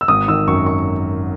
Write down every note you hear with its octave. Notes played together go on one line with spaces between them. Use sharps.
E6
G#1 D#6
D#3 E6
F#2 C#6
C#6